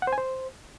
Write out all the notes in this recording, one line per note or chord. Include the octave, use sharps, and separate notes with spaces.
F#5
C5
G#5
C5